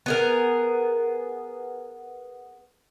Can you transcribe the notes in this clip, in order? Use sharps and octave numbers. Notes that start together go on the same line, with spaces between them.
B3 G#4 A#4